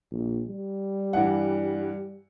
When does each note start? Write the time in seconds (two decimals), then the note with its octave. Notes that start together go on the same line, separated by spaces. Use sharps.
0.11 A#1
0.48 G3
1.13 G2 E3 F#5